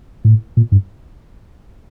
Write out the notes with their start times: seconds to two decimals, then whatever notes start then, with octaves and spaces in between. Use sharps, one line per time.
0.25 A2
0.57 A#2
0.72 G2